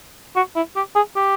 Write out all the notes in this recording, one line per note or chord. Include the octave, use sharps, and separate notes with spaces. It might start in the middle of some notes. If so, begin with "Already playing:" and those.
F#4
E4
G4
G#4
G4